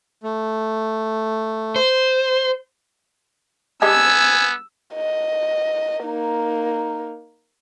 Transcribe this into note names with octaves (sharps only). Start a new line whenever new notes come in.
A3
C5
G3 G#3 B3 D4 G#5 E6
D#5
A#3 D#4